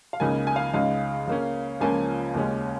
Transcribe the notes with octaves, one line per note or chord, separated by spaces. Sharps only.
F5
C#2 C#3 A#3 D#4 G#5
G#5
F5
C#2 C#3 G#3 D#4 F5
C#3 A#3 C#4
C#2 C#3 F3 A#3 C#4 G#5
D#2 C#3 G#3 C#4